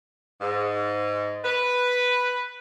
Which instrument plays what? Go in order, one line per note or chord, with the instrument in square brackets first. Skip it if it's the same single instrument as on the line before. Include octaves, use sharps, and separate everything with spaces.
[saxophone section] G#2
B4